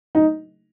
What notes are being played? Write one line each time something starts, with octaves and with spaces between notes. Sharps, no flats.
D#4